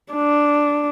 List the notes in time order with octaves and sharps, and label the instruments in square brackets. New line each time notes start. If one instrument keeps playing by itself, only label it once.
[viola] D4